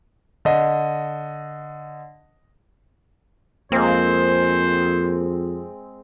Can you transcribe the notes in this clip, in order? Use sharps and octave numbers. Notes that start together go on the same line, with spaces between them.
D3 D#5
F2 G#3 A#3 C4 C5